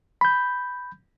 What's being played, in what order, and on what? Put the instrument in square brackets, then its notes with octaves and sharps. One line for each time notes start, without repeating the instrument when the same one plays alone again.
[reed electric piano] B5 G6